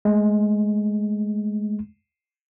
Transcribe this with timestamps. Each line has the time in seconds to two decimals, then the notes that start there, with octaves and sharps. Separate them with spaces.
0.05 G#3 A3